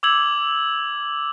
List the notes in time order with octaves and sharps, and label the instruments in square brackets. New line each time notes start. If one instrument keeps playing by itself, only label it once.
[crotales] D6 E6 G#6 F#7